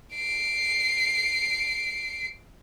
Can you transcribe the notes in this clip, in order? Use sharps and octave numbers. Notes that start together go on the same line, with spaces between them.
C7 D7